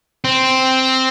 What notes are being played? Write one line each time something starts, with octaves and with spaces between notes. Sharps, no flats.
C4